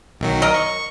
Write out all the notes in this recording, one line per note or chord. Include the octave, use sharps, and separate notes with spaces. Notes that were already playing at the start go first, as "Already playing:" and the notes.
B1 D#3 F#3
A#4 D#5
C#6